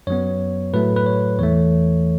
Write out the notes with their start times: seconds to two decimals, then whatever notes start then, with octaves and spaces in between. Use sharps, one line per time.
0.07 F#2 F#3 B3 C#5
0.73 A2 F#3 A3 B4
0.96 B4
1.06 C#5
1.39 E2 E3 A3 C#5